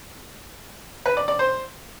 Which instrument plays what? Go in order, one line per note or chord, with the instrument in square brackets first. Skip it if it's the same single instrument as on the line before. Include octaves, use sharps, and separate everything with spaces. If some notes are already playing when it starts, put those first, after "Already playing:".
[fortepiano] B4
D5
D5
C5